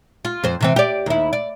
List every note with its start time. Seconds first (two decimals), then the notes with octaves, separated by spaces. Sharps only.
0.25 F4
0.44 F2 C5
0.61 C3 E3 C4
0.76 G4 D5
1.06 D#2 E4
1.33 D5